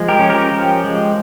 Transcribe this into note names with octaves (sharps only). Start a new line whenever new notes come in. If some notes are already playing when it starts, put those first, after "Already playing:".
Already playing: F3 G#3
G4 A#4
C#4
G4 A#4
F3
G#3